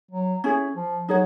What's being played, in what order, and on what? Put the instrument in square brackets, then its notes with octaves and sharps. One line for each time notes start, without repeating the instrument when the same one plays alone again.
[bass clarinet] F#3
[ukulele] C#4 E4 G#4
[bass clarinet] F3
[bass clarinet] F#3 [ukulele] D#4 G#4 C#5 F#5